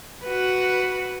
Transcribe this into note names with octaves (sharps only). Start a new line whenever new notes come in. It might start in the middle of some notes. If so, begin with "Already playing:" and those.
F#4 B4